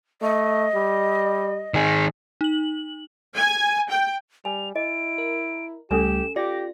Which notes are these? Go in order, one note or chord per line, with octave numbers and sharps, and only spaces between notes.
A3 D#5
G3
D#3 G#4
D#4 F#7
G#5
G5
G3 G#5 F7
E4 D#5 D7
A#4
C#2 G3 A3 C#4 G4 A4 G#5 E7
F4 G4 D5 D6 A#6